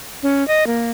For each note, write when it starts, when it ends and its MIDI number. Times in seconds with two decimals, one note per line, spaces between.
0.23 0.46 61
0.48 0.66 75
0.67 0.91 58